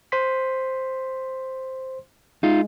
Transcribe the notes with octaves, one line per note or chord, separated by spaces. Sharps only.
C5 C6 B6
G#3 D#4 F4